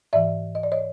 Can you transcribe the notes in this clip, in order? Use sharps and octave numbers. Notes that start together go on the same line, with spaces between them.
G#2 E3 D5 E5
D#5
D5
C#5 D#5